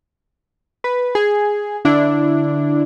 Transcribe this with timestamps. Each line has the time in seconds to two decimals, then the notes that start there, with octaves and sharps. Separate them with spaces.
0.84 B4
1.15 G#4
1.85 D3 D4 E4